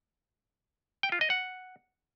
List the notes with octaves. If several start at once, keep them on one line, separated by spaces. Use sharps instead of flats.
G5
F4
D#5
F#5